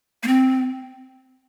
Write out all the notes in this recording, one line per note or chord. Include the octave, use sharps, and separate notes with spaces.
A#3
C4